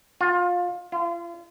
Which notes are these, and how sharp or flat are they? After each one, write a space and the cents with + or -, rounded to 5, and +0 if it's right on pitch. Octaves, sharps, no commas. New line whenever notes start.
F4 +25
F4 -35